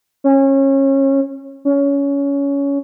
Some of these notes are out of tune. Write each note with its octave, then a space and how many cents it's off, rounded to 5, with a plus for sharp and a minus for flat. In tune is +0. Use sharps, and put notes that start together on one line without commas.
C#4 -25
C#4 +20